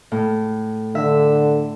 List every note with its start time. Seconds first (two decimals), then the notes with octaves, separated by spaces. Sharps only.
0.12 A2
0.95 D3 E5